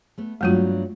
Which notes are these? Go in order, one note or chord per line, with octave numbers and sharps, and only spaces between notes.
A3 B3
G2 F#3 G#3 A3 B3 F4